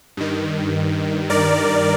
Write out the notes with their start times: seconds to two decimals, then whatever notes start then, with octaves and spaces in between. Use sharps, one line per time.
0.17 G2 D#3
1.30 G2 D#3 A#4 D5